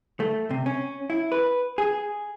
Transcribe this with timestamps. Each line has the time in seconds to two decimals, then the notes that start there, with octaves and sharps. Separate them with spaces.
0.20 A3
0.51 C3
0.66 C#4
1.10 E4
1.32 B4
1.78 G#4